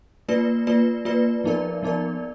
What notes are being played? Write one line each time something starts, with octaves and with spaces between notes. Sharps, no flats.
A#3 F4 B4 D5
A#3 F4 B4 D5
A#3 F4 B4 D5
F3 B3 D#4 A#4 D5
F3 B3 D#4 A#4 D5